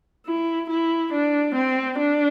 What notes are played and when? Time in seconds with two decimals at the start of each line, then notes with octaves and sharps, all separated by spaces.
0.26 E4
0.70 E4
1.13 D4
1.55 C4
1.98 D4